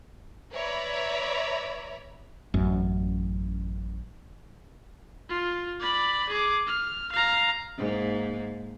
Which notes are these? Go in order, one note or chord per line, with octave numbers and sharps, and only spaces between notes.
B4 C#5 D5 E5 A#5 B5
A1 F#2
F4
D5 B5
G#4 D6
F6
F5 A#5
G#2 A#3